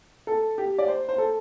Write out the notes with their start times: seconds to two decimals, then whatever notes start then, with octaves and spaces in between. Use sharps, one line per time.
0.27 A4
0.58 G4
0.78 D5
0.88 C5
1.09 C5
1.18 A4